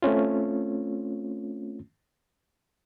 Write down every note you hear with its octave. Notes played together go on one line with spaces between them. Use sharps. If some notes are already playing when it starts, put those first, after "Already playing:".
A3 C4 C#4 F4